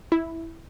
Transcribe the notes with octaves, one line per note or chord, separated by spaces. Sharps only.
E4